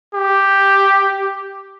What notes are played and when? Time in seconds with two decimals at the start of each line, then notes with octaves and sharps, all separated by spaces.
0.14 G4